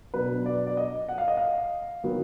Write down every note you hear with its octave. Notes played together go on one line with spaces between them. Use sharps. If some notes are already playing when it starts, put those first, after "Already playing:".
B2 F#3 D4 B4
D5
D5
D#5
F#5
F5
D#5
F5
D#3 F#3 B3